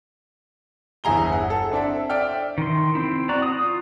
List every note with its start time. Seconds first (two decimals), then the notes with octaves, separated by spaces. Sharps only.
1.04 G1 E2 E4 G#4 A#5 G7
1.32 F#5
1.50 A4
1.71 C4 D4 A4 E5
2.10 D5 E5 G5 F6
2.58 D#3 C6
2.95 C4 E4
3.29 F#4 D5 A#5
3.42 D#6
3.61 F4